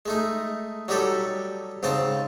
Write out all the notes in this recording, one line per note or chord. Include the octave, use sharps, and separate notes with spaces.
G#3 A3 D#4
F#3 G3 D#4 G4 A4
G#2 C#3 C4 C5 A5